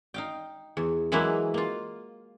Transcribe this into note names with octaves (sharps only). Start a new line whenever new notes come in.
D#4 F5 G5
E2
E3 F#3 G#3 A#3 E4 B4
A#3 F4